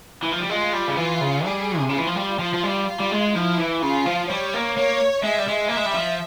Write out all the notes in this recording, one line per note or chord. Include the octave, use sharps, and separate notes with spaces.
E3
F3
G3
G#3 F4
G3
C#3
E3 F4
C#3
G3 G#4
C3
C#3 F4
E3
F3
G3
F3 F4
F3
G3
F4
G3
G#3
F3 E4
E3
C#3 F4
F3
G3 C#5
A#3
A#3 C#5
G#3 E5
G3
G#3
A#3 E5
G#3
G3
F3